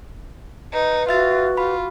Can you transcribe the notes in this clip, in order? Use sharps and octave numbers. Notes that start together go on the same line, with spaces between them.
D#4 B4
F4 F#4 E5 A6
F4 B5